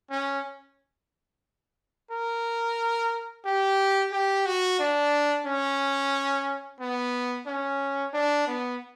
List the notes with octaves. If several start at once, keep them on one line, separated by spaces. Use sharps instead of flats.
C#4
A#4
G4
G4
F#4
D4
C#4
B3
C#4
D4
B3